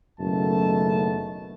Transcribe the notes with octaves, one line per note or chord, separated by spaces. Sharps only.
F#1 F#2 B2 D#3 A3 A5